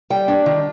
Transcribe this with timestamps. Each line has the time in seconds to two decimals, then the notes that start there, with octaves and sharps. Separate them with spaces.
0.10 G3 G5
0.28 D4
0.46 D#3